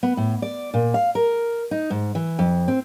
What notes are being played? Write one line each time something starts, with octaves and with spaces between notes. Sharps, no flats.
B3
A2
D5
A#2
F5
A#4
D#4
G#2
E3
F2
C4